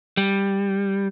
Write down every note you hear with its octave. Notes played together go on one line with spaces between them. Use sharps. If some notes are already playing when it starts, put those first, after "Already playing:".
G3